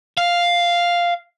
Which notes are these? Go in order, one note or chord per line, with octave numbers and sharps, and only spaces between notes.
F5